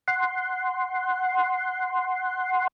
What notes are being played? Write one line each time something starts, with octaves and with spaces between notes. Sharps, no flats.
F#5 C6